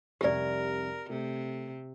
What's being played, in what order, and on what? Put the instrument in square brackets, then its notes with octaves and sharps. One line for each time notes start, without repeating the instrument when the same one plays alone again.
[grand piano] F1 C2 [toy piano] G4 D5 [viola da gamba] A#4
[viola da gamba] C3 [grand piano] A3